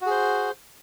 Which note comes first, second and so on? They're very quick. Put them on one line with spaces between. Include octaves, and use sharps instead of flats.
F#4 G#4 C5